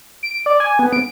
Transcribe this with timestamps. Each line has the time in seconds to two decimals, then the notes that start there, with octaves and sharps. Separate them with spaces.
0.23 D7
0.46 D5
0.60 G#5
0.79 B3
0.93 D7